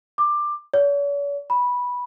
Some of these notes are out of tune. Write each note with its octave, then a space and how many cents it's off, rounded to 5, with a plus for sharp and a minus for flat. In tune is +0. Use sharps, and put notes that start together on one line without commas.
D6 +15
C#5 +45
B5 -10